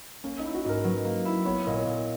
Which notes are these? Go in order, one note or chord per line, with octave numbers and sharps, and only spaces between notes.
A#3 C#4
D#4
E4
F#4
G#2 A#4
F#3 B4
A#3
E4
B3 C#5
A#2 D#5
C#5
A#2